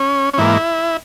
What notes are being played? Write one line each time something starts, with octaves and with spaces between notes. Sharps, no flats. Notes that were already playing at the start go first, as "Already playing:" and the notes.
Already playing: C#4
C#4
G#2 E3 A#3 E4